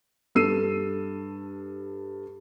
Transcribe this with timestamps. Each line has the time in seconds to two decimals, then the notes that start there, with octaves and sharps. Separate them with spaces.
0.35 G2 A4 E6 C7 D#7